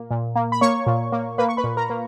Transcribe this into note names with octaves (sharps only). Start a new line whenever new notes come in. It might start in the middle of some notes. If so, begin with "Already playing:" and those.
Already playing: A#2 A#3
A#2
A#3
B5
A#3 C#5 C#6
A#2
A#3
A#3 B4 B5
C#6
B4 B5
A#2
A#4 A#5
A#3